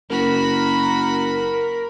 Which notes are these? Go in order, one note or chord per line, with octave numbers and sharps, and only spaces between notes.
F#1 F#4 A#4 B5